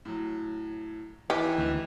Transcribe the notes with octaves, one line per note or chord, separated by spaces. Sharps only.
A2 F#3
D#3 E3 G4 G#5
D2